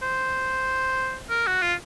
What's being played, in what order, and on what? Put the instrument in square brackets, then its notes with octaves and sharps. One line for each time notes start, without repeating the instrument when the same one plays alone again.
[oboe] C5
A#4
F#4
F4